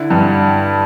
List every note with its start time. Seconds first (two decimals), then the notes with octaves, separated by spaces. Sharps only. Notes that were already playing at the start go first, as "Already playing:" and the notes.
Already playing: D3 E4
0.10 G2